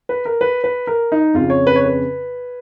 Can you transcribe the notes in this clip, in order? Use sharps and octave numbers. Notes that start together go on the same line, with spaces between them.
B4
A#4
B4
B4
A#4
D#4
F2 C#3 F4
C#5
B4
C#5
B4